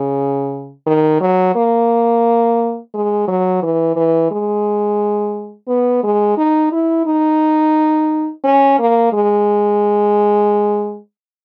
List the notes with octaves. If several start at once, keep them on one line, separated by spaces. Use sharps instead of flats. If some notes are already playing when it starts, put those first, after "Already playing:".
Already playing: C#3
D#3
F#3
A#3
G#3
F#3
E3
E3
G#3
B3
G#3
D#4
E4
D#4
C#4
A#3
G#3